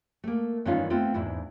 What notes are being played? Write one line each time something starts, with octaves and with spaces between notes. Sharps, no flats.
A3 A#3
G2 D#3 E3 C#4 D#4 F4
A3 B3 C4 F4
E2 G#2 D4 E4